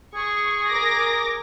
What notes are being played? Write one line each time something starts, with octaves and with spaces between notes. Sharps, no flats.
G#4 C#6
A#4 D6 A#6